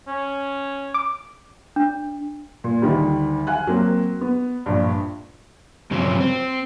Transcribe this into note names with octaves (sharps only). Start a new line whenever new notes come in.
C#4
D6
D4
A#2
D2 D#3 G3
F5 G#5 F#6
F#3 A#3 C4
B3
A#1 G2
G2 C#3 F3 F#3 C4
C4